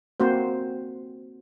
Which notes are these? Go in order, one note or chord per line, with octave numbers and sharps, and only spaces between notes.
A#3 C4 F#4 C5